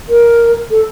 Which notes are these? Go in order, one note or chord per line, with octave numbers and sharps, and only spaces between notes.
A#4
A4